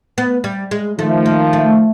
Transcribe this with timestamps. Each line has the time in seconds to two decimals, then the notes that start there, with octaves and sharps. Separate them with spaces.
0.18 B3
0.44 G3
0.71 G#3
0.99 D#3 F3 A3
1.26 A#3
1.53 A3